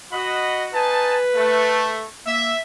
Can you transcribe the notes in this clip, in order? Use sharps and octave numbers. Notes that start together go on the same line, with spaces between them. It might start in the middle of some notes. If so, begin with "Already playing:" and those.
F#4 D#5 B5
D#4 B4 G#5 A5
A3
A#3 E5